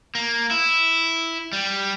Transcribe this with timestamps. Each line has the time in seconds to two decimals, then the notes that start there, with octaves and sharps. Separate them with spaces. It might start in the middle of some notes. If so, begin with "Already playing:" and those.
0.15 A#3
0.51 E4
1.53 G3